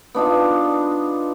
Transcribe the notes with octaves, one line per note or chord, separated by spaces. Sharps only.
B3 D4 D#4 F4